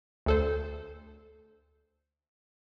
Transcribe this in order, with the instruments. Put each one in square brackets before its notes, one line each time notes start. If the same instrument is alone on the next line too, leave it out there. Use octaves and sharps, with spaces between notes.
[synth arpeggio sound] D2 A4 C5